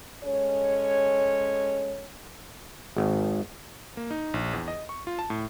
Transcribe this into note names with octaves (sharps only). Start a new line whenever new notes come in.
G#3 C#4 A4 C#5
G#1
A#3
D#4
A#1
E2
D#5
C#6
F4
A5
A2